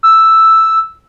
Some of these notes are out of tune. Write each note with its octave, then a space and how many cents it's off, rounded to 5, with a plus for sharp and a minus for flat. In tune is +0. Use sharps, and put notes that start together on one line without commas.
E6 +0